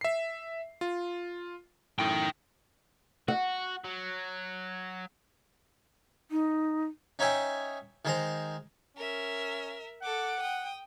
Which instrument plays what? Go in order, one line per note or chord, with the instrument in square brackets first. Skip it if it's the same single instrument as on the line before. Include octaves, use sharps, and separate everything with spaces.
[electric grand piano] E5 C7
F4
[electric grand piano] F#2 A2 [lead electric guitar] D#4 G5
[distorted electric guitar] F#4 [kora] F#5
[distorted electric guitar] F#3
[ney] D#4
[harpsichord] C#4 D#4 C#5 E5 G5 G#5
D#3 G#3 C5 A#5
[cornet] C#4 [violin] A#4 E5
[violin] A4 D6 [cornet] F#5
[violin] G5 D#6